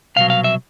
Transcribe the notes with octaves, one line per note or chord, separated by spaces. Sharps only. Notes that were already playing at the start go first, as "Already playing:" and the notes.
C2 B2 F#3 F5
F5
E5